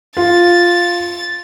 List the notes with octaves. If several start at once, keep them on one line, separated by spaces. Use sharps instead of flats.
F4 A6